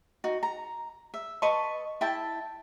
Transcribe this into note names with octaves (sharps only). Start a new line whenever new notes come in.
D#4 F#4
A#5
E5
B4 D#5 A5 C#6
E4 E5 G5 A5